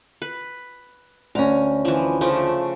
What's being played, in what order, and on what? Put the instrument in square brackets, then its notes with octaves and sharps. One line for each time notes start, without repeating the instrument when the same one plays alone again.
[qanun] B4
[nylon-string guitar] D2 C#4 [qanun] A#5
[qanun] E3 F3
C#3 F3 A3